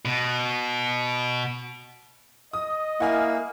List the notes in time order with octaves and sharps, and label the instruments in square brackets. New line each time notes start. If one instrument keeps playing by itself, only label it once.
[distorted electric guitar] B2
[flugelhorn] D#5 [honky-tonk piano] D#6
[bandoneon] A#3 [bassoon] E4 [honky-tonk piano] F#5 G#5 F6